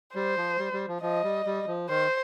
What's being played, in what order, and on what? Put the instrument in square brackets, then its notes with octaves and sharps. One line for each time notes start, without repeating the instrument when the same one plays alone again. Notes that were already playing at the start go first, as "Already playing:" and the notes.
[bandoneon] G3 [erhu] C5
[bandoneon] F3
G3
G3
F3
[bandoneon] F3 [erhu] D#5
[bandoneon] G3
G3
F3
[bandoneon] D#3 [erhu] C5